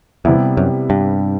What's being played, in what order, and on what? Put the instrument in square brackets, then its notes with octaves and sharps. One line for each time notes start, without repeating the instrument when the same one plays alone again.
[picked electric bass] E2 [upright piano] C3 G3 B3 E4
[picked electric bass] F#2
G2